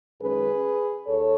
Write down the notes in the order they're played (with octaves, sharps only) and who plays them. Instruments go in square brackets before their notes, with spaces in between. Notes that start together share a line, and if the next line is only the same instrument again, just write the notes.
[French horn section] F#2 D#3 G#3 C#4 G#4 B4
D#2 A4 C#5